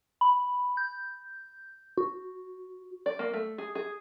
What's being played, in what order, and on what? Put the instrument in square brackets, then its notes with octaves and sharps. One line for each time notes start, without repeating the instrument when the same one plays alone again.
[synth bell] B5
G6
F#4
[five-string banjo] D5
A#3
A3
G#4
G#4